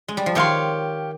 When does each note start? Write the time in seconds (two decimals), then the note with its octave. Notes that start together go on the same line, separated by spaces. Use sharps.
0.08 G#3
0.17 G3
0.26 F3
0.35 D#3 G4 C#5 F5 C6